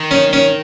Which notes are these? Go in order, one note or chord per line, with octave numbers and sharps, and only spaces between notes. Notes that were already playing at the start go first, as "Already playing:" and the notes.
Already playing: D#3
C#4
C#4